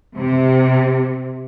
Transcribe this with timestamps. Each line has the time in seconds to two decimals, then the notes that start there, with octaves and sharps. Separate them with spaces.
0.17 C3